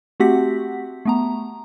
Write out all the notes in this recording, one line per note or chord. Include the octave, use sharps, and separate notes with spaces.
A3 C4 F#4 G4 F#5 B6
A3 B3 A#5